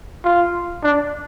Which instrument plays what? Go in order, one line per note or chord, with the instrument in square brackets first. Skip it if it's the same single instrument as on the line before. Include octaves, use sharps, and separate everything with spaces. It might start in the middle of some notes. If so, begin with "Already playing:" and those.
[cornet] F4
D4